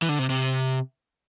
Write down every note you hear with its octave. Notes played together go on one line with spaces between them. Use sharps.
E3
D3
C3
C3